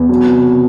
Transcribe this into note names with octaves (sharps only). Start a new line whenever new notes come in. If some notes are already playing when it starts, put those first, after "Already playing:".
Already playing: E2
F#3
C3